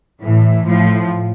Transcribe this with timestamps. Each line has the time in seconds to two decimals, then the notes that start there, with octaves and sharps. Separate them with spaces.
0.22 A2 E3
0.64 A2 F3